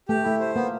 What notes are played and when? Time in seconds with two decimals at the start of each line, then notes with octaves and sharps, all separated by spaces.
0.08 A3 G4
0.24 A3 E4
0.40 C5
0.55 A#3 B3